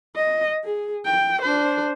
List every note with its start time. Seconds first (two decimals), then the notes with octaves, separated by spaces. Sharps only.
0.16 D#5
0.64 G#4
1.05 G5
1.42 D4 C5